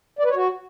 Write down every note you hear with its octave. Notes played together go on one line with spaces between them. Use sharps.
D5
B4
C#5
F#4